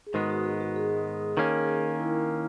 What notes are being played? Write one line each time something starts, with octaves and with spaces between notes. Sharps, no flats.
G#4
G#2 D#3 G#3 B3 F#4
F#4
G#4
F#4
G#4
D#3 A#3 C#4
E4